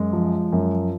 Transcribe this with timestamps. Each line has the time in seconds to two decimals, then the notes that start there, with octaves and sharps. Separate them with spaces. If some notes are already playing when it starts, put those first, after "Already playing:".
Already playing: F#2 G#3
0.13 F3
0.53 F#2